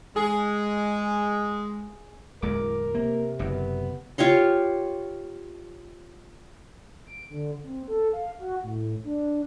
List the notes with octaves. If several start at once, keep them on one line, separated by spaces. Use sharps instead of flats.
G#3 G#4
D1 E2 G#3 A#4 D6
C3 A#3
F#1 F#2 B3
F4 G4 C#5 C6
D7
D3
C4
A4
F5
F#4
A2
D4